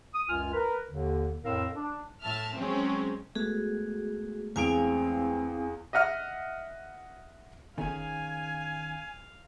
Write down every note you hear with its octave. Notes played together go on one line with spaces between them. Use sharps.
D#6
C#2 F#2 F4 G#5 F6
A#4 B4
D#2 D3
F2 A2 C4 A#4 F5 E6
D4
A2 E5 A5 F6
F#3 G#3 C4 C#4
G#3 A3 B3 F#4 G#4
E2 C4 E4 G#4 F5 G#5 D7
D#5 E5 F#5 F6
G1 D#3 C#4 G#4 F5 G#5